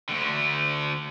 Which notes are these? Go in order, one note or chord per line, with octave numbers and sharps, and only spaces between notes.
D2 D3